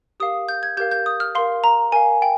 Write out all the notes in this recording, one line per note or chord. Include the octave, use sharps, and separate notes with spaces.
G4 A#4 F5 D#6
G6
G#6
G4 A#4 F5 G6
G6
D#6
F6
A#4 F5 C6
A#5
A#4 F5 G#5
G5